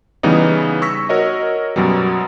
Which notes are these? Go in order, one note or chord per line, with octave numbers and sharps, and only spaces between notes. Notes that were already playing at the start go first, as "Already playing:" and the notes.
C#3 E3 G3 B3 D#4
C#6 E6 A#6 B6
F#4 A#4 C#5 D#5
F#2 B2 F#3 G3